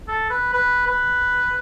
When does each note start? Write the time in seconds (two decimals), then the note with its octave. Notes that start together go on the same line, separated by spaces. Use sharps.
0.08 A4
0.30 B4
0.53 B4
0.87 B4